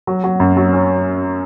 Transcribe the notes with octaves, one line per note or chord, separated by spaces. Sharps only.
F#3
F#3
F#2
F#3
C#4